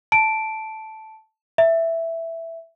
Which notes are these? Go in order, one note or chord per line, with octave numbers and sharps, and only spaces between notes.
A5 D7
E5